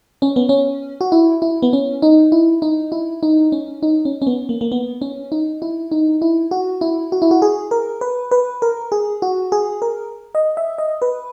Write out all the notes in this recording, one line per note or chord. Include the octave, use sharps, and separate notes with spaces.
C#4
B3
C#4
F#4
E4
E4
B3
C#4
D#4
E4
D#4
E4
D#4
C#4
D#4
C#4
C#4
B3
A#3
A#3
B3
C#4
D#4
E4
D#4
E4
F#4
E4
F#4
E4
F#4
G#4
A#4
B4
B4
A#4
G#4
F#4
G#4
A#4
D#5
E5
D#5
B4